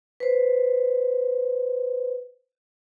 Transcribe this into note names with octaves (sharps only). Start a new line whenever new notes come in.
B4 C5